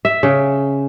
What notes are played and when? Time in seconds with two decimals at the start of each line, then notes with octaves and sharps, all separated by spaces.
0.05 E5
0.23 C#3